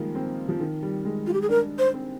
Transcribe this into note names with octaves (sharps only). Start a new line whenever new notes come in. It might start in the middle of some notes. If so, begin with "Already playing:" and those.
Already playing: D#3 F3 G3 G#3 A#3
C4
F3
D#3
G3
G#3
F4
G4
G#4
D4 A#4
C5
C4